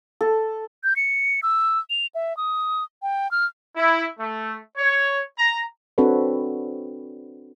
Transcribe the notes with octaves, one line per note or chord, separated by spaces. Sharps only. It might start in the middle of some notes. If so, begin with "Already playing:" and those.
A4
G6
C#7
E6
F7
E5
D#6
G5
F6
E4
A3
C#5
A#5
C4 D4 F#4 A4 B4 C#5